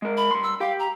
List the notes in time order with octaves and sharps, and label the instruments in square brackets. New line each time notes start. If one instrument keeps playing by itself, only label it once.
[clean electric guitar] G#3 A#4
[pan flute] B5
[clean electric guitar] G2 C6
[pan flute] E6
[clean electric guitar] G4 G5 [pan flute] F5
[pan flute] A#5